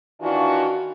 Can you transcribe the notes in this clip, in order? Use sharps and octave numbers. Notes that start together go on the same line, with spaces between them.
D#3 E3 D4 F4 F#4